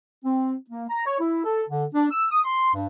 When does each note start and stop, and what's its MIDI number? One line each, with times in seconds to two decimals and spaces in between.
0.24 0.55 60
0.70 0.85 58
0.89 1.04 82
1.05 1.18 73
1.20 1.44 64
1.44 1.64 69
1.68 1.84 50
1.94 2.08 62
2.11 2.27 88
2.31 2.39 87
2.44 2.73 84
2.74 2.87 43